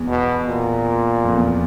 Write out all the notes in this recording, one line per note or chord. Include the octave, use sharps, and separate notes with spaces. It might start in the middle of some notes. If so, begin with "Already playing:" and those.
Already playing: E2
B2
A#2
F2
E2